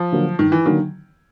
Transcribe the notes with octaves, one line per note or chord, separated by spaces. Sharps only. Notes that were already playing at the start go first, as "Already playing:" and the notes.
Already playing: F3
D3 F#3 A#3
G2 D#3
E3
D3 D#3 F#3 A#3